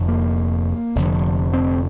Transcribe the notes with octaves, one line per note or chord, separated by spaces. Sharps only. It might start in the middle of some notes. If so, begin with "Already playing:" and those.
Already playing: F1 F2 D3
A#3
F1 F2 D3
C4